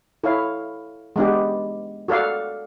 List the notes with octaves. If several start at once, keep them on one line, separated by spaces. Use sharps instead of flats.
E4 A4 C#5 F5
G#3 B3 D4 G4
F#4 A4 D5 F5